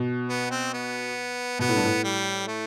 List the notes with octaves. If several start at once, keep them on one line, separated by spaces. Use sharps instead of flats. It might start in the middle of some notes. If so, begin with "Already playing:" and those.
Already playing: B2
B3
C4
B3
B2 B3
A2
G2
A2
G3
A3